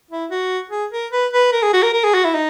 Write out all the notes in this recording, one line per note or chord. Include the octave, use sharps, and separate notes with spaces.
E4
F#4
G#4
A#4
B4
B4
A#4
G#4
F#4
A#4
A#4
G#4
F#4
E4
D#4